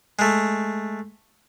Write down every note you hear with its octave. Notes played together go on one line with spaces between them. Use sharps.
G#3 A3